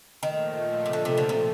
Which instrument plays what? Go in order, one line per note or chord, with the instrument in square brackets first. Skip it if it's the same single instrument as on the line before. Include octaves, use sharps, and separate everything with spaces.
[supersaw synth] A#2 F3 A3 [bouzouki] D#3
[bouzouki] C3
D3
C3
D3
C3